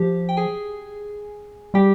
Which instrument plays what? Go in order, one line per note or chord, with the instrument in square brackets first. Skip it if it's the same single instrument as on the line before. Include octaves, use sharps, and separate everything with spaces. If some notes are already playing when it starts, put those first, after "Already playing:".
Already playing: [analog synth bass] F3 [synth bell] G4
[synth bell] G5
G#4 G#5
[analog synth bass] G3 [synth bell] G4 G5